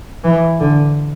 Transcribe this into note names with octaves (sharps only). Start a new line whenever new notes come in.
E3
D3